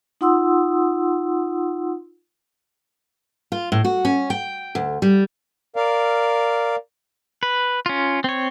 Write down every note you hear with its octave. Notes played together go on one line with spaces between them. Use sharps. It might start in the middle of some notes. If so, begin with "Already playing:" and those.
D#4 F4 F#5 C6 D#6 E6
F4
A2
F#4
C#4
G5
D2
G3
A#4 D5 F5
B4
C#4 F4
C4 C#5